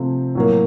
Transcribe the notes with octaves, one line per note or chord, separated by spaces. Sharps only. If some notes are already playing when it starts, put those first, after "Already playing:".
Already playing: C3 F3 A3 C4
A2 F#3 A#3